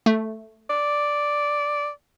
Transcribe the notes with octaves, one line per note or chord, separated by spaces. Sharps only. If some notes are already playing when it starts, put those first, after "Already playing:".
A3
D5